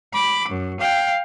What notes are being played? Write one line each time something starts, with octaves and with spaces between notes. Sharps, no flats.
B5 D6
F#2
F5 G5